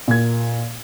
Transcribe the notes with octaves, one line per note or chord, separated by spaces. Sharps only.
A#2 A#3 G#6